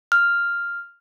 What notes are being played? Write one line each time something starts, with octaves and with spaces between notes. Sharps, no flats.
F6